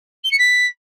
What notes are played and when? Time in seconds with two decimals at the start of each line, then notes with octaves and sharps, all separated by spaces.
0.24 G7
0.31 C#7
0.38 B6